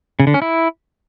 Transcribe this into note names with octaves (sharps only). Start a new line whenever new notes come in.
C#3
D3
C#4
E4